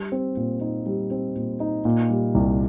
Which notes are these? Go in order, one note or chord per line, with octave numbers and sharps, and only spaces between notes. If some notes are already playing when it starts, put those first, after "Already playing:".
Already playing: G3
C4
A#2
D#4
G3
C4
A#2
D#4
A#2
G3
C2